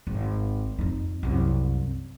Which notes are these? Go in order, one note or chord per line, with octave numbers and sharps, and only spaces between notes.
G#1
F2 D#4
C2 F#2